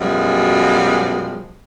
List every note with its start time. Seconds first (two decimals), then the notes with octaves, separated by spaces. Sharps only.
0.01 F#2 B2 F3 G3 G#3